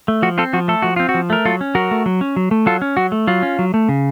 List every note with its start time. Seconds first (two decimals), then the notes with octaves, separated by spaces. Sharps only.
0.08 A3
0.22 F3 F#4
0.38 C4 F4 A4
0.53 F3 F#4
0.68 A3 A4
0.82 F3 F#4
0.96 C4 F4
1.09 F#4
1.14 F3
1.30 A3 A#4
1.45 F#3 F4 A4
1.61 C#4
1.75 F#3 F#4 A#4
1.91 A3
2.06 F#3
2.21 C#4
2.36 F#3
2.51 A3
2.66 F#3 F4 A4
2.82 C#4
2.97 F#3 F#4
3.12 A3
3.27 F#3 F4
3.43 C#4
3.59 F#3
3.74 A3
3.89 C#3